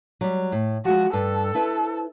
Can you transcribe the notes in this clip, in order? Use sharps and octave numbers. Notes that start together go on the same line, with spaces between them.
F#3 G3
A2
F3 G#3 F#4
G2 A4
E4 B4 C5